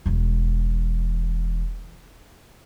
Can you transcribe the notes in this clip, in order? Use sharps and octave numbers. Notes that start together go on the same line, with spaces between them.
E1 E3